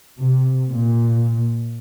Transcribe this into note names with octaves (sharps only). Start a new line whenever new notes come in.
C3
A#2